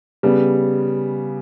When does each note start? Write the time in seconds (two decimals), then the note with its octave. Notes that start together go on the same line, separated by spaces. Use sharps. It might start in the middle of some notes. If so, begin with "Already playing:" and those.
0.23 C#3 G3 B3